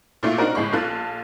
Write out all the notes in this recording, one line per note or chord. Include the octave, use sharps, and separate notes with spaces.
A#2 A3 E4 F4
C4 D4 D#4 F#4 A#4
G1 A2 G#3 B5 C#6
A#1 F4 A4 F#6